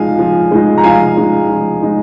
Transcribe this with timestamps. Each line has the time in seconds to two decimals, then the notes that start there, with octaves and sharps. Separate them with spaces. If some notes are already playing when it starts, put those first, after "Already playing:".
Already playing: F3 G#3 D#4 F5 G#5
0.19 F3
0.51 G#3 D#4
0.78 A#5
0.84 F3 F5 G#5
1.17 G#3 D#4
1.49 F3
1.82 G#3 D#4